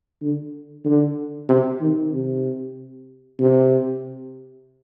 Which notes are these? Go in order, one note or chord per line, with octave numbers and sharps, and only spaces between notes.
D3
D3
C3
D#3
C3
C3